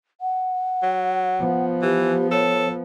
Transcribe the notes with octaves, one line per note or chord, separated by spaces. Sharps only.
F#5
F#3
F3 B3
E3 G4
A4 C#5